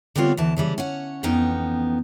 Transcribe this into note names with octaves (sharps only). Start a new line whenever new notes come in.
D3 G3 B3 C4 F4 C#5
D2 E3 A5
C#3 E3 G3
C#4 C#5 F#5
F2 E3 B3 C#4 D#4 G5